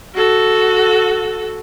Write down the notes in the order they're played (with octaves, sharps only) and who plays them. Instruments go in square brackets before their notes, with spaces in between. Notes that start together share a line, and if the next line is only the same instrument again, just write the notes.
[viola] F#4 A4